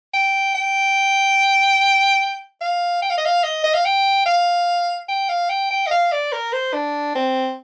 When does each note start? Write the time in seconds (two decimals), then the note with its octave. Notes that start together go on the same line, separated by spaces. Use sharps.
0.14 G5
0.54 G5
2.61 F5
3.02 G5
3.10 F5
3.18 D#5
3.25 F5
3.43 D#5
3.64 D#5
3.74 F5
3.85 G5
4.26 F5
5.08 G5
5.29 F5
5.49 G5
5.70 G5
5.86 D#5
5.91 F5
6.12 D5
6.32 A#4
6.53 C5
6.73 D4
7.15 C4